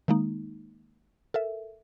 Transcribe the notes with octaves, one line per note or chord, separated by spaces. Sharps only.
D#3 G#3 A#3 D#4
A4 A#4 E5